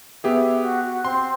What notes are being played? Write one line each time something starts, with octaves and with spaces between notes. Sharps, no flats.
B3 G4 G#4 E5
F#4
F#4
C4 C6